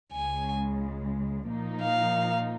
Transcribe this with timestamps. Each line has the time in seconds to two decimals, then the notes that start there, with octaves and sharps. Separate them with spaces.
0.13 C#2 C#3 G#3 G#5
1.48 A#2 F3 A#3 D#4
1.82 F5